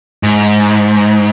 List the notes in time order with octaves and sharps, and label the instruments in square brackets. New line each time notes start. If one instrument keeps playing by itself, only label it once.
[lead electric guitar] G#2